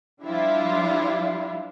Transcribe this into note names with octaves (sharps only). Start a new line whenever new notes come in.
F3 G3 D4 E4 F4